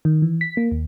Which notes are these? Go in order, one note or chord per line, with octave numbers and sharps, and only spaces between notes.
D#3
E3
B6
A#3
D#2